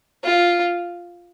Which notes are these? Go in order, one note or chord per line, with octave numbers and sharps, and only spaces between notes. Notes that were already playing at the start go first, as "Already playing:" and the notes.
F4